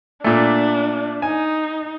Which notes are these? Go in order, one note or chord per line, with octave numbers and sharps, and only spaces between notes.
A#2 A3 D4
D#4 G#5